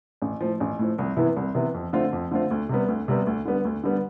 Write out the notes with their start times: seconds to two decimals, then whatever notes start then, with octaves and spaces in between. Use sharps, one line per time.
0.22 A1
0.41 A2 F3
0.60 A1
0.79 A2 F3
0.98 C2
1.17 C3 E3 B3 E4
1.36 C2
1.55 C3 E3 B3 E4
1.74 F2
1.93 D3 A3 C4 F4
2.13 F2
2.31 D3 A3 C4 F4
2.51 D2
2.69 C3 G3 B3
2.88 D2
3.08 C3 G3 B3
3.27 D2
3.45 D3 G3 B3
3.65 D2
3.84 D3 G3 B3